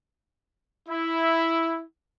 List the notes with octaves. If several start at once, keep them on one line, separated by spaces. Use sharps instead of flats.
E4